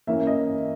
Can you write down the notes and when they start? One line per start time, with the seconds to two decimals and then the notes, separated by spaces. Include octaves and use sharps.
0.07 E3 A#3 C#4 E5
0.27 D#5